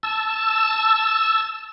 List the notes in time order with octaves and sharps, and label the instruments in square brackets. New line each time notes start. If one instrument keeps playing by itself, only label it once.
[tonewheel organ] A5 E6